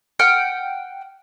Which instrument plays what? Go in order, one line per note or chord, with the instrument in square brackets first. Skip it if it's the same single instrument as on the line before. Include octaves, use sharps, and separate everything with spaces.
[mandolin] F#5 G5 F6